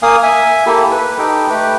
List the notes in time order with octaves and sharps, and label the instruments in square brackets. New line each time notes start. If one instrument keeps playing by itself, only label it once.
[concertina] A#3 F5 G#5 D#6
E5 G#5
A#3 E4 G4 A4
B4
D#4 G4 A4 G5
A3 G4 B4 G5